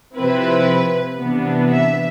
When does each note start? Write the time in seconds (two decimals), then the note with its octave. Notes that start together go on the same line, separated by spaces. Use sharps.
0.18 C3 F3 C4 E4 B4
1.19 C3 E3 B3 D4
1.71 E5